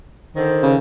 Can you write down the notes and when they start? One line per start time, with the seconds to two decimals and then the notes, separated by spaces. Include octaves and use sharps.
0.35 D3 D#3 C5
0.63 C#3